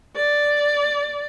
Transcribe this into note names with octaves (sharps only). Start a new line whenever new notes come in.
D5